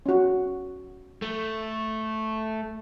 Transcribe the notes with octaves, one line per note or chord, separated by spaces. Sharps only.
C#4 F#4
A3